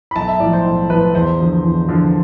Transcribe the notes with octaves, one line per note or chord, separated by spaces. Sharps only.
B5
B1 A5
E5
A2 F3 D5
C5
B1
A2 F3 B4
E2 C5
D3 F3
E2
D3 F3